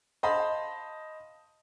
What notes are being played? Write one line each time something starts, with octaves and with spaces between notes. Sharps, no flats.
C5 D#5 F5 A5 B5